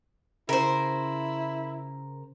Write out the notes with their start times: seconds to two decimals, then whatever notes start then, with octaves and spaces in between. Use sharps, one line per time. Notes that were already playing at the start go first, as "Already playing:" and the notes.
0.49 C#3 E4 A#4 C5